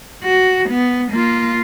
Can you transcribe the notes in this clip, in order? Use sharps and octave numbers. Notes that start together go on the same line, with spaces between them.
F#4
B3
A#3 F4